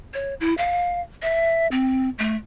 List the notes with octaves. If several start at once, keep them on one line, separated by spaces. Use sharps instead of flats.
C#5
E4
F5
E5
C4
A3